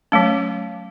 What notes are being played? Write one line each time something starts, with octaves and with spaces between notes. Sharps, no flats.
F#3 A3 C#4